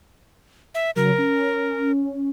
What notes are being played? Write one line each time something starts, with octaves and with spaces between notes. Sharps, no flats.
E5
C#3 F#3 A#4
C#4